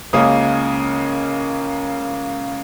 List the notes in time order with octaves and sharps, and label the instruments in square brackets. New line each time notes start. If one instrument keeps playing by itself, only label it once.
[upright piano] C#2 C#3 A#3 C#4 D#6